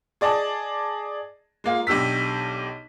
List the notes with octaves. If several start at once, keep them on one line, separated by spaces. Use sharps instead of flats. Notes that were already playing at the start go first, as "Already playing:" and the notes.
G#4 D5 D#5 A5
G#3 A#3 F4
B1 D4 G4 E6 B6